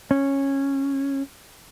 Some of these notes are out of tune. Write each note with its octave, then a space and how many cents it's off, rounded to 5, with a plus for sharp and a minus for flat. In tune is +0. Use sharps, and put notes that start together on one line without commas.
C#4 -10